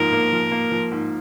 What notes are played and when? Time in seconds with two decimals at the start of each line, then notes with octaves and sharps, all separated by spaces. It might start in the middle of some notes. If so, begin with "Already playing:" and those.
Already playing: G#2 F3 A#3 A#4
0.12 A#3
0.32 F3
0.51 A#3
0.71 F3
0.91 G#2